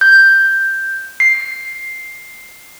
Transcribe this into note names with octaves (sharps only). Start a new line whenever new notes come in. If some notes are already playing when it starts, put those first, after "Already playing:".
G6
C7